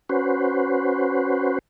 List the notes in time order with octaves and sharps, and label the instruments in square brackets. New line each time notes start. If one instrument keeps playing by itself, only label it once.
[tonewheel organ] C#4 F#4 B4 C5